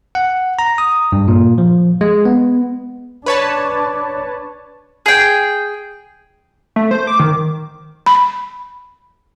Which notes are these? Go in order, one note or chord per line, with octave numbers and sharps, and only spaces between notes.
F#5
A#5
D#6
G2
A#2
F3
G#3
B3
D4 B4 C#5 A5
G#4 G5
A3
C5
D6
D#3
B5